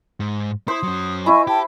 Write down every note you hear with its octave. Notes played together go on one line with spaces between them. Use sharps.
G#2
E4 C5 D#6
F#3 C#4
E4 D#5 G#5 C#6
G4 G5 A5